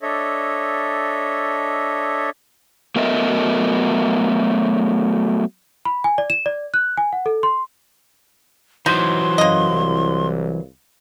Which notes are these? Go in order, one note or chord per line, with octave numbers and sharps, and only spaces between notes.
D4 A4 C#5 D#5 E5
F#3 A3 B3 A#4 D#5 E5
B5
G#5
D5
E7
D5
F#6
G#5
F#5
A4
C6
E3 F#3 D#4 C5 C6
F#2 A#3 D#5
C2